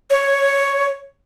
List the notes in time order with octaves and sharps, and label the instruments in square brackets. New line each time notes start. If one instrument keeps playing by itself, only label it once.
[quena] C#5